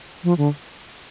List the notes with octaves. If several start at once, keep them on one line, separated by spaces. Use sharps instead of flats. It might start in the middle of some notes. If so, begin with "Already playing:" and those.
F3
D3